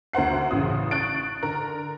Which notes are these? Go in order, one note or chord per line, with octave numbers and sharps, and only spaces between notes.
D2 A#4 C5 F#5 C7
A1 C#3 D#6
C#6 F#6 A6 D7
D3 A#4